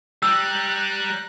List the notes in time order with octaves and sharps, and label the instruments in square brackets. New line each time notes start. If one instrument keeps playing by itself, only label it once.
[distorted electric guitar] G3 [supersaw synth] A#5 F#6 [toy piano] E6